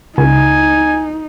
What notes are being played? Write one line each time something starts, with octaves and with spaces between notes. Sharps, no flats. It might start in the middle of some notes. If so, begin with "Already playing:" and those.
C#2 D#4 G#5